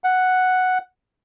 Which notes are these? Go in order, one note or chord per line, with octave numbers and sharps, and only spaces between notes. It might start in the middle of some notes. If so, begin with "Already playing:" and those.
F#5